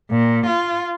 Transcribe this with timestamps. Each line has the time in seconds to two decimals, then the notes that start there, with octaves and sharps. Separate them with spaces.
0.12 A#2
0.47 F4